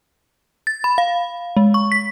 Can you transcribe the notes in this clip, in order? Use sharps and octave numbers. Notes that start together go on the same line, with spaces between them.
A6
B5
F5
G#3
C#6
B6